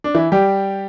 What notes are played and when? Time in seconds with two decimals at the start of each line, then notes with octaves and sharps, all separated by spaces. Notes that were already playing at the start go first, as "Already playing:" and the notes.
0.04 D4
0.14 E3 E4
0.32 G3 G4